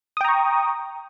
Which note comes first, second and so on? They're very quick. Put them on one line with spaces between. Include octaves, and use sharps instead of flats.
D#6 G5 A#5 C#6